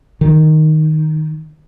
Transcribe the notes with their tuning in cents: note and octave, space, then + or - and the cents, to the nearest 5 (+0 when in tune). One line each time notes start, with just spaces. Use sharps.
D#3 -5